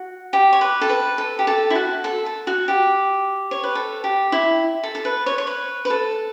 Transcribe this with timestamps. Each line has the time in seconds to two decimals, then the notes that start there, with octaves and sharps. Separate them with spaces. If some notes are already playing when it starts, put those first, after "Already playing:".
Already playing: F#4
0.33 G4
0.53 C#5
0.61 B4
0.81 A4
0.89 B4
1.18 A4
1.39 G4
1.47 A4
1.70 E4
1.75 F#4
2.04 A4
2.26 A4
2.47 F#4
2.68 G4
3.51 C#5
3.63 B4
3.75 A4
4.04 G4
4.32 E4
4.83 A4
4.95 A4
5.05 B4
5.26 C#5
5.38 C#5
5.47 B4
5.85 B4
5.90 A4